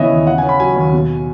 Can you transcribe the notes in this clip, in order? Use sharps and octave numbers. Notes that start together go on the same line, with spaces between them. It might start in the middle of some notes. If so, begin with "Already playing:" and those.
Already playing: C#3 E3 B3 C#5 D#5 E5
D#2
C#3 F#5
G#5
C#4
B5
F#3 G#5
D#2
B2